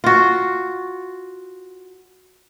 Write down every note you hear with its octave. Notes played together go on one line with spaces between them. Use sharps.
F4 F#4